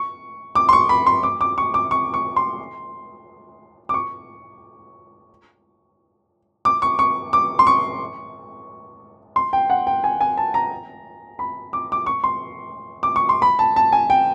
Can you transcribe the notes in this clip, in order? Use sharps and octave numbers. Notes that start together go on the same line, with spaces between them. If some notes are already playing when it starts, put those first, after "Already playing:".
Already playing: C#6
D6
C6
C#6
B5
C6
D6
D6
C#6
D6
C#6
C#6
C6
D6
C#6
D6
C#6
C#6
D6
C6
C#6
C6
G5
F#5
G5
G#5
G#5
A5
A#5
B5
D6
D6
C#6
C6
D6
C#6
C6
B5
A5
A5
G#5
G5